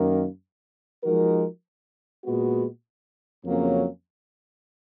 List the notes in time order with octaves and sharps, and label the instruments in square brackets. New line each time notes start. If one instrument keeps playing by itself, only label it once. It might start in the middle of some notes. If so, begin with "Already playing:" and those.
Already playing: [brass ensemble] F#2 D#3 A#3
F3 G#3 D#4 F#4 A#4
A#2 G#3 B3 F#4
F2 C#3 F#3 A#3 C#4